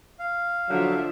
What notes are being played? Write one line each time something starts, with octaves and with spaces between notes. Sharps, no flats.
F5
D3 F3 F#3 D4 E5